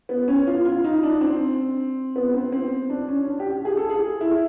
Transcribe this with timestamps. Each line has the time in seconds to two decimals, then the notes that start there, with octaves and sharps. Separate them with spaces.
0.09 B3
0.28 C#4
0.47 F4
0.65 F4
0.84 D#4
1.03 D4
1.21 C4
2.16 B3
2.34 C4
2.52 C4
2.90 D4
3.09 C#4
3.27 D4
3.40 G4
3.52 G4
3.65 G#4
3.77 A4
3.89 G#4
4.21 E4